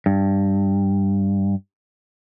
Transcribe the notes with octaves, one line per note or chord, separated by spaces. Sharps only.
G2